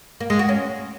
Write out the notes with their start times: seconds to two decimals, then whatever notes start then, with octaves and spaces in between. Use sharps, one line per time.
0.20 A#3
0.30 G#3
0.39 F#4
0.49 C#4